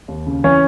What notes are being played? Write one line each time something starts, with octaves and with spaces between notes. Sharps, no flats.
D#2
C#3
E3 C#4 C#5